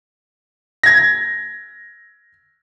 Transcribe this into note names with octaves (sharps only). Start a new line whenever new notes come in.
G#6 A#6